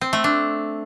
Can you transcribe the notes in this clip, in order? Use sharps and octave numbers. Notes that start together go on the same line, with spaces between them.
C4
A3
D4